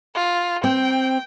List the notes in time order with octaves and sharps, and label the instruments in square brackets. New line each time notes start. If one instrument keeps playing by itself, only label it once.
[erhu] F4
[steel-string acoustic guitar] C4 [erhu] G5